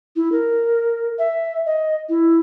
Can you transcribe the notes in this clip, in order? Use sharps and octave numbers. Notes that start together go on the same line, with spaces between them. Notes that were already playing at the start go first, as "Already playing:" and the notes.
E4
A#4
E5
D#5
E4